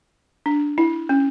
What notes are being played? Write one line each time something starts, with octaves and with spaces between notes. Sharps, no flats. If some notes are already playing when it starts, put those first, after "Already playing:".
D4
E4
C#4